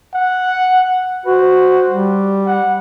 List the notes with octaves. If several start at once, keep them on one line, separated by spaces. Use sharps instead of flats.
F#5
F#4 C5
G3
F#5